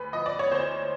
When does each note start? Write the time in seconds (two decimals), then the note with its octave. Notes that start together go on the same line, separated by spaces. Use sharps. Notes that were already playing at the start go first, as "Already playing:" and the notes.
Already playing: D2 B4
0.13 F3 D#5
0.26 D5
0.39 C#5
0.51 D2 C5